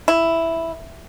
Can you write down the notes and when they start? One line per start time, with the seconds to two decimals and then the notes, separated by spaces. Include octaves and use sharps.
0.08 E4